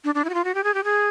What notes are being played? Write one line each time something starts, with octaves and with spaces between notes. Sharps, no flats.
D4
D4
E4
F#4
F4
F#4
G4
G#4
G4
G#4